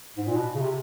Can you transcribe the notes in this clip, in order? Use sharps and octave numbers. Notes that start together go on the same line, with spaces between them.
G#2
A#2
B2
C#3
C3